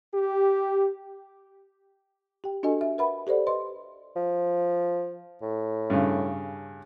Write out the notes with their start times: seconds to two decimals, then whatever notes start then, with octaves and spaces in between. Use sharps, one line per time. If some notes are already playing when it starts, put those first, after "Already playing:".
0.14 G4
2.44 G4 G5
2.63 D4 F#4 A4 D#5 G#5
2.81 E5
2.98 A#4 B4 E5 F#5 B5
3.27 G4 A4 C5 D5 F#5
3.47 B4 D#5 C6
4.16 F3
5.42 A2
5.90 G2 C#3